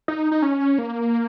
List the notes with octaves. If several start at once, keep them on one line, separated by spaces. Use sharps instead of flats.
D#4
D#4
C#4
A#3